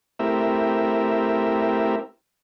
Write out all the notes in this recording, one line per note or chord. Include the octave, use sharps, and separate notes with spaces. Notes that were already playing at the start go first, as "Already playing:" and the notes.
A3 C4 E4 G4 A#4 E5